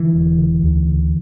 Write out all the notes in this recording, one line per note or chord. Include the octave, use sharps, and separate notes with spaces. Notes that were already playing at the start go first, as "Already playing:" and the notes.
Already playing: D3 E3
E1
D3
D2
D3